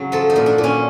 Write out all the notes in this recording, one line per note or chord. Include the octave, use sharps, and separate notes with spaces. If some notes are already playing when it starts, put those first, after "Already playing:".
Already playing: C#3 F#3
F3 A4
D#4
A#2
D4
A#2
C#4